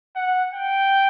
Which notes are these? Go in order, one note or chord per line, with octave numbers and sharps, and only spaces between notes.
F#5
G5